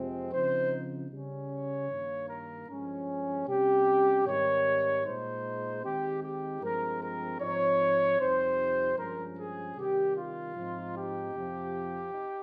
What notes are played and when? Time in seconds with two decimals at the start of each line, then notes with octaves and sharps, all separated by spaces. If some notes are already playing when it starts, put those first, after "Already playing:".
Already playing: F2 C3 F3 G#3 C4
0.32 C#3 F3 C4 D#4 C5
1.11 C#3 G3 C#4
1.50 C#5
1.89 G2 D#3 A#3
2.28 A#4
2.68 G2 F3 G#3 C#4
3.47 C3 G3 C#4 G4
4.25 G#2 D#3 G3 C4 D#4 C#5
5.04 A#2 G#3 D#4 C5
5.83 D#3 G#3 C4 D#4 G4
6.22 G4
6.61 G2 F3 G#3 C4 A#4
7.01 A#4
7.40 G#2 F3 C4 D#4 C#5
8.19 F2 C3 G3 C4 D#4 C5
8.97 G2 F3 G#3 C#4 A#4
9.37 G#4
9.77 C3 D#3 G3 G4
10.16 F4
10.55 G#2 F3 C4 D#4
10.95 G4
11.33 F2 C3 F3
12.12 D#4